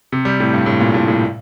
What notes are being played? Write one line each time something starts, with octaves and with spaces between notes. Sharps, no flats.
C3
G3
A2
G2
A2
A#2
A2
A2